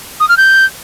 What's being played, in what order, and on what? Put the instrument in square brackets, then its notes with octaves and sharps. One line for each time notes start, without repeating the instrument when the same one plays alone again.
[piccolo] D#6
F6
G6